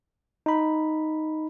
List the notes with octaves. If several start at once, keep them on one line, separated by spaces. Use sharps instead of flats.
D#4 B5